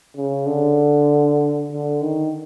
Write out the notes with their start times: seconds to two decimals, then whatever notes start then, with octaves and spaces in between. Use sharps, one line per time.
0.16 C#3
0.47 D3
1.72 D3
2.02 D#3